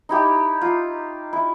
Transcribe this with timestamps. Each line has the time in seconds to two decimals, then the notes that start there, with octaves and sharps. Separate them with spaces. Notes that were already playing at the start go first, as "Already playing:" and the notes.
0.09 D#4 E4 G4
0.61 F4
1.33 E4